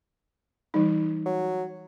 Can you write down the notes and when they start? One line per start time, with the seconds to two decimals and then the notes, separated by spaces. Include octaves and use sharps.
0.74 E3 G3 D#4
1.25 F#3